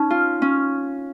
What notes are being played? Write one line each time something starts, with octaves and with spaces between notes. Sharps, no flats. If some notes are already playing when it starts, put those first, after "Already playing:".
Already playing: C#4 D#4
F4
C#4